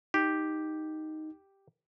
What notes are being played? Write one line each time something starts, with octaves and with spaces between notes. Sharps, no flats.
D#4 G4